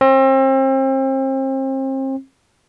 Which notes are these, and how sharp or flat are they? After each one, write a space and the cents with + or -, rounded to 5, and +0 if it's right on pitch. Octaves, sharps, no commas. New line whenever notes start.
C4 +35